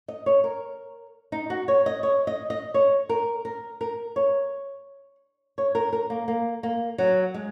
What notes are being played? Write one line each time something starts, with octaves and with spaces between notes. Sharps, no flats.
D#5
C#5
A#4
D#4
F#4
C#5
D#5
C#5
D#5
D#5
C#5
A#4
A#4
A#4
C#5
C#5
A#4
A#4
A#3
A#3
A#3
F#3
G#3